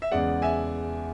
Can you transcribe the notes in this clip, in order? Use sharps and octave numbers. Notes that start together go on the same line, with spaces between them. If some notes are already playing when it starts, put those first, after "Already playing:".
E5
E2 C#3 G#3 D5 F#5
E5 G#5